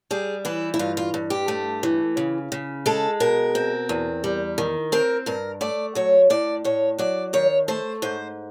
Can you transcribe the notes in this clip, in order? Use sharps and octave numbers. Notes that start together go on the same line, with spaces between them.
G3 G#4
E3 E4
E4
G2 F4
F4
G2
G4
A3
E3
C#3
C#3
G#3 A4
B2 A#4
C4
E2
G3
D#3
C4 A#4
G2 A#4
A3 D5
F#3 C#5
A2 D5
A2 C#5
F#3 D5
D#3 C#5
A3 C5
G#2 C5